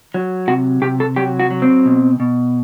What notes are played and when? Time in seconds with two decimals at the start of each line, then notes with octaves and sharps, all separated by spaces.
0.14 F#3
0.48 C3 F#4
0.82 C3 G4
1.00 A4
1.16 F#3 G4
1.40 F#4
1.50 F#3
1.62 C4
1.86 B2
2.20 B2